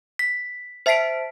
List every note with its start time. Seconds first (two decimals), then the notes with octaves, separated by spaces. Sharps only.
0.19 B6
0.86 C5 E5 A5 B6 C7 D7